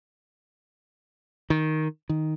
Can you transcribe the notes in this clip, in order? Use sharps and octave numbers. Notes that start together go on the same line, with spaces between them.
D#3
D#3